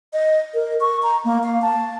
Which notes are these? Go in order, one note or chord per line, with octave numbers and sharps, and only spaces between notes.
D#5
A#4
C#6
A#5
A#3
F5
A5